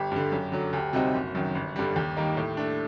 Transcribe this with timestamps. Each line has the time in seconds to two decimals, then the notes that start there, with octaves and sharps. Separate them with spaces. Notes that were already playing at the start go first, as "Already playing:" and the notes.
Already playing: G1 G4
0.12 G2 D3
0.32 F#2
0.52 D3 F#3
0.73 D2 G4
0.93 C3 G3 C4 D#4 F#4
1.14 F#1
1.35 F#2 D#3
1.55 G1
1.76 G2 D3 G3
1.96 D#2 G4
2.16 D#3 G3 A#3 D#4
2.37 A2
2.57 A3 D4